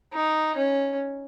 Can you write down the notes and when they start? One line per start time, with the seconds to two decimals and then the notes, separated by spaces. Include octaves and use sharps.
0.13 D#4
0.56 C#4